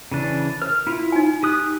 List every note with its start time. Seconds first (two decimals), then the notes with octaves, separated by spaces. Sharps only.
0.12 C#3 E3 D4
0.62 A#4 F6
0.87 E4 F4
1.12 D#4 G#5
1.43 G4 D#6 F#6